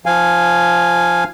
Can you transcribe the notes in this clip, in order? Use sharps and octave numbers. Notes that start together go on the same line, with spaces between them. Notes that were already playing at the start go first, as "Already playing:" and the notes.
F3 F5 G#5